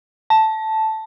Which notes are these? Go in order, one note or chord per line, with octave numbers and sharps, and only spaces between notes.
A5